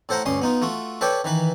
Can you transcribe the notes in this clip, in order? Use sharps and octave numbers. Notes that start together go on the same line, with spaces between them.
A2 A4 C5 F#5 A#5
D2 G2 C#4 C6 D#6
B3 D#4 F4
A3 F4 F#4
A4 B4 C#5 D5 G5
D#3 E3 B4